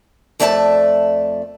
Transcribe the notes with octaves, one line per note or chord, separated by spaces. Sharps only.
F2 A3 D5 E5 G#5 A5